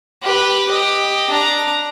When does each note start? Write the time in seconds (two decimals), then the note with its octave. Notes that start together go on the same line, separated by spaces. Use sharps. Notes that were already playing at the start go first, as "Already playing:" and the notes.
0.23 G4 B4
0.68 G4 D#5
1.30 D4 A#5